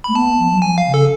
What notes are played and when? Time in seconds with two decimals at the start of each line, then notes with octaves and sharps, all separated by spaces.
0.04 A3 B5
0.15 B3 A5
0.39 F3
0.51 F#3
0.62 F3 G#5
0.78 F5
0.86 C#3
0.94 A4